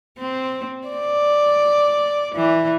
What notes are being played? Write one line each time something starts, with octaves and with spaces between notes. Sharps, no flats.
C4
D5
E3